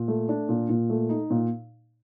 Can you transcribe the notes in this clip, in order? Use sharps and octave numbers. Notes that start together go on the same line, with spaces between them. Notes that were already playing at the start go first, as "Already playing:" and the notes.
Already playing: A#2
A3
D4
A#2
A#2
A3
D#4
A#2